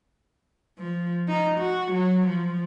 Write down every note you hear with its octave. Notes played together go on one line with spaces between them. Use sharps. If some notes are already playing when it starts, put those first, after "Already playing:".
F3
D#4
F#4
F#3
F3